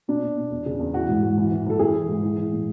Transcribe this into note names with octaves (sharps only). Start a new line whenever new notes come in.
B2 D4
B2
B2
E2
C#3
E2
E3 F#4
G#2
G#2
E3
E3
E3 A4
E3 G#4
E3
G#2
E3
E3
A2